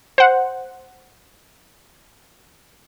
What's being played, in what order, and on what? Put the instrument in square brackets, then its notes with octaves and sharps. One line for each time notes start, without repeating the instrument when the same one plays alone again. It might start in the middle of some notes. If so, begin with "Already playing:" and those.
[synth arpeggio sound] C5 F#5